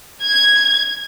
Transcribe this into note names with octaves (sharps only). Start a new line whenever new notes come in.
G#6